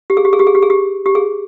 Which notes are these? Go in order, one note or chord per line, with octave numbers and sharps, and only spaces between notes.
G4
G#4
G4
G#4
G4
G#4
G4
G#4
G4
G4
G#4